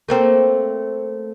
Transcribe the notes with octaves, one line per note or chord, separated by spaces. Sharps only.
A3 A#3 C4